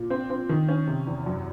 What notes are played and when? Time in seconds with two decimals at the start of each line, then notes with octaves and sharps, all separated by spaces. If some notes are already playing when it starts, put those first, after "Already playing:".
Already playing: A#2
0.10 C4
0.30 C4
0.49 D#3
0.68 C#4
0.87 C3
1.07 E2
1.26 F#2